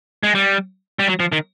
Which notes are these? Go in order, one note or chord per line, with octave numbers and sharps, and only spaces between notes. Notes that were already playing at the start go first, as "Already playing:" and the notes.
G#3
G3
G3
F#3
F3
D#3